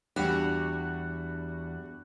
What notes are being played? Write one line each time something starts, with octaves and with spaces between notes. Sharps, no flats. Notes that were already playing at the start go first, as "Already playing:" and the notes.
E2 G3 D4 F#4 F#5 B5 F#6 E7